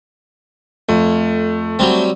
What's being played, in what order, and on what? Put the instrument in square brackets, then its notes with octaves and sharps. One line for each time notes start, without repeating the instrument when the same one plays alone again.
[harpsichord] F2 [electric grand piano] A3
[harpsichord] F#3 G3 C4